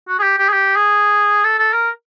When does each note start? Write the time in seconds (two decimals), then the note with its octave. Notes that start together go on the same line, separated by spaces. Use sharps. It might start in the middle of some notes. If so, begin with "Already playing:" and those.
0.08 F#4
0.19 G#4
0.23 G4
0.38 G4
0.49 G#4
0.53 G4
0.76 G#4
1.44 A4
1.59 A4
1.73 A#4